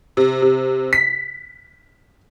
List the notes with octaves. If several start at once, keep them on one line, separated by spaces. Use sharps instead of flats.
C3
C3
B6